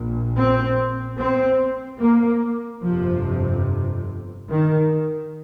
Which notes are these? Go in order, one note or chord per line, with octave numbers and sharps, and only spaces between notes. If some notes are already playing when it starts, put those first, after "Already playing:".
Already playing: A#1 A#2
C4
C4
A#3
G1 F2 C3 F3
D#3